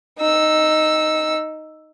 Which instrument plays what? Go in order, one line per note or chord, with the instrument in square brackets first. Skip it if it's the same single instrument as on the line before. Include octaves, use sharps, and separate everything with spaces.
[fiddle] D#4 E6